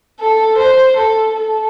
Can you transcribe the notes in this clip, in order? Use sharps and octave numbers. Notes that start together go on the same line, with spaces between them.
A4
C5
A4
A4